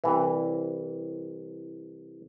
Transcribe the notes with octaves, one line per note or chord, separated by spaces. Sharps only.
C2 E3